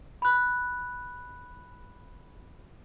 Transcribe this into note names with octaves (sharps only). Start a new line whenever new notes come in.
B5 F#6